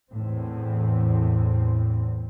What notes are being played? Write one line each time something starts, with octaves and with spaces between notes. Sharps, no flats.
E2 A2 C4